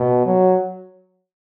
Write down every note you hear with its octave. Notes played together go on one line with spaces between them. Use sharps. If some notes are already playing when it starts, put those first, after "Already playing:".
Already playing: B2
F#3